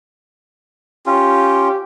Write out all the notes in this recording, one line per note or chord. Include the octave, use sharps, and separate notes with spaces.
C#4 F4 G4